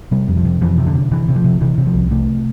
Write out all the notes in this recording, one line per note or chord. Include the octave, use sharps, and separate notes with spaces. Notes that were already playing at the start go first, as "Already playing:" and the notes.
C3 G3
F2
F3
C3
F2 E3
C3
D3
C3
C3 E3
C3
F3
C3
C3 E3
C3
F3
C2
C3 A3